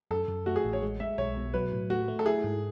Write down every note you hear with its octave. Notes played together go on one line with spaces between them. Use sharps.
F#2 A4
F#2
A3 F#4
G#4
A1
C#5
G#3
G#3 E5
B1 C#5
B2
F#3 B4
A2
A3 F#4
A3
A4
E4 G#4
G#2